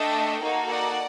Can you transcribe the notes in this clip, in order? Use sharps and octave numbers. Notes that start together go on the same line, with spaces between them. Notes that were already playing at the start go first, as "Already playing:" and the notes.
Already playing: A3 D4 A4 D#5 G5
A#3 D#4 F#4 A4
D5 F#5